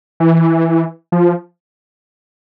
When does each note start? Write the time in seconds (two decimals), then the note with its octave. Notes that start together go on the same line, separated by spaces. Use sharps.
0.20 E3
1.12 F3